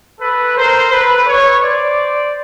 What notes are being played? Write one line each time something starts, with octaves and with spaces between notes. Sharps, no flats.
A4 B4
A#4 C5
A4 B4
B4 C#5
C5 D5